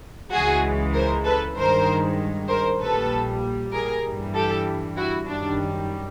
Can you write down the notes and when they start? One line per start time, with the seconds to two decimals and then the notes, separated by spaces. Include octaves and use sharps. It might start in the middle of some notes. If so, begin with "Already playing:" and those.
0.32 C#2 C#3 E3 G#3 F#4 G#4
0.94 A#4 C5
1.25 A4 B4
1.56 G2 D#3 G#3 A#4 C5
2.48 A#4 C5
2.80 A#1 A#2 G3 A4 B4
3.72 G#4 A#4
4.04 G2 E3 G3
4.34 G4 A4
4.96 E4 F#4
5.27 F#2 D#3 G3 D4